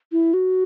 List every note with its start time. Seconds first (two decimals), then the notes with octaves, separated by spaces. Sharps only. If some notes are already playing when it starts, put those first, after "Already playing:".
0.12 E4
0.34 F#4